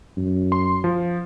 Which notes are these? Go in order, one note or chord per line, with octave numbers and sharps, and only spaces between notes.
F#2
C6
F3